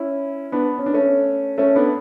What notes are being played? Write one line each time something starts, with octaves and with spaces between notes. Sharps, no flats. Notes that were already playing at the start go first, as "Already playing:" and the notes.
Already playing: C#4 E4
B3 D4
C#4
D4
A3 C#4
A3 C#4
B3 D4